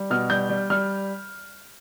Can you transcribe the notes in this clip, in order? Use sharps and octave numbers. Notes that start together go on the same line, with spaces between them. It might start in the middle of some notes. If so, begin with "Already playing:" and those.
Already playing: G3
B2 F6
G3 G6
G3
G3 F6